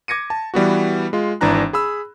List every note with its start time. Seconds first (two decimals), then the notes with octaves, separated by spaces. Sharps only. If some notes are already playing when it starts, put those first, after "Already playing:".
0.08 D6 G#6 A#6 C#7 D#7
0.30 A5
0.54 E3 G3 B3 F#4
1.13 G#3 F4
1.41 G#1 E3 D4 A#5 F#6
1.73 G#4 B5 E6